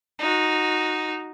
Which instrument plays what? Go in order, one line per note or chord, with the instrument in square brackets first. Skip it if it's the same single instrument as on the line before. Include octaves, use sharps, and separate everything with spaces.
[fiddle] D#4 F#4